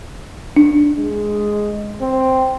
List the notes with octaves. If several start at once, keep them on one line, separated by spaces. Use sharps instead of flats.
D4
G#3
C4